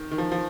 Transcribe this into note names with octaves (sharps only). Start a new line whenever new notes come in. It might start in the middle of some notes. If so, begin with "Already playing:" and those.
Already playing: D#3
D#3
F3
F3